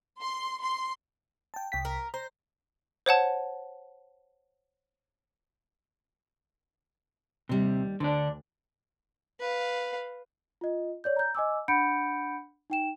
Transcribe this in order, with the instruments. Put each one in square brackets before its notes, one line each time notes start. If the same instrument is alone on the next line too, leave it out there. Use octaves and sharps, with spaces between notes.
[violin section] C6
C6
[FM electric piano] G5 A5
C2 G5 B6
[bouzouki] A#4
[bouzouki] C5 [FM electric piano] A#5
[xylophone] C5 C#5 F#5 A5
[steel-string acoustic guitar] D#2 G3 [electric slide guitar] C3
[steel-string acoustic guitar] D2 [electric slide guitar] D3 D4
[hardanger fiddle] B4 F5
[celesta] F4 D#5
C#5 D5 G6
A#5 G6
D#5 G#5 D6 E6
D4 F#5 B5 G6 C#7 D7
D#4 G5 E7